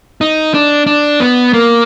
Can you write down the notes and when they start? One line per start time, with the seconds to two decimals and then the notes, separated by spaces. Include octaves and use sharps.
0.21 D#4
0.54 D4
0.87 D4
1.20 B3
1.53 A#3